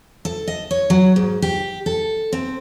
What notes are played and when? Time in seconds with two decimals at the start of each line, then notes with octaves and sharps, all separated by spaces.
0.25 A4
0.47 D#5
0.71 C#5
0.90 F#3
1.16 G#2
1.42 G4
1.86 A4
2.32 C4